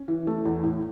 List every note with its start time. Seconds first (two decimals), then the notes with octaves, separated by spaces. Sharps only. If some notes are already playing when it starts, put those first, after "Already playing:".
Already playing: C#4
0.08 E3
0.27 A3
0.45 E2
0.63 A2